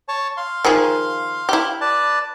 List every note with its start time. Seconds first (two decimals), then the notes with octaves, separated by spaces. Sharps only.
0.08 C#5 A5
0.37 F5 C6
0.65 D#3 F3 G#4
1.49 E4 G4
1.81 B4 D5 A5